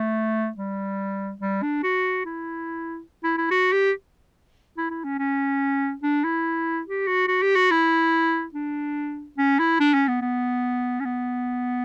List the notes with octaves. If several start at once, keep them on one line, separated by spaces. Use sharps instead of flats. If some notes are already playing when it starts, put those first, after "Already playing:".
Already playing: A3
G3
G3
D4
F#4
E4
E4
E4
F#4
G4
E4
E4
C#4
C#4
D4
E4
G4
F#4
F#4
G4
F#4
E4
D4
C#4
E4
D4
C#4
B3
B3
C#4
B3